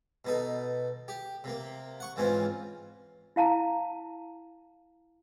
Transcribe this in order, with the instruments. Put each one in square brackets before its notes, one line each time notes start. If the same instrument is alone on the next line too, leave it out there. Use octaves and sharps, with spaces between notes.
[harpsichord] B2 D#4 A4
G4
C3 A#3
F#5 C#6
G#2 E3 C4 C#4 F4
[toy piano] E4 F5 A5 A#5